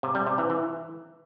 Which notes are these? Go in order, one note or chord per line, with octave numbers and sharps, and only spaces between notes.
C3
G3
C3
E3
E3